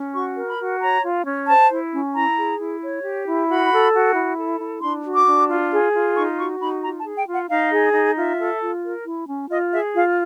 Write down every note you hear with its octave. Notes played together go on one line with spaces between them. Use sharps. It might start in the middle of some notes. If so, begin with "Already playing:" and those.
Already playing: C#4
F#4 C#6
A#4
B5
F#4
C#5 A#5
F4
C#4
C5 A5
E4
C#4
E4 A#5
G#4
E4
C#5
G4
E4
F#4 B5
A4
F#4
E4
A4
E4
D4 C6
F#4
D6
D4
F4
G#4
F4
D#4 C#6
F#4 C#6
D#4 B5
F4 A#5
A5
G#4
G5
F4 F#5
D#4 F5
G#4
D#4
F4 E5
A4
F4
A#4
E4
C#4
F4 D#5
G#4 E5
F4 F5